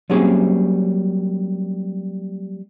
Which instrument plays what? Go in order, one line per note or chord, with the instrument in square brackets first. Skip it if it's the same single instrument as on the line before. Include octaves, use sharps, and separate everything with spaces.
[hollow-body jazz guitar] F#3 G3 A#3 C4 C#4 G#4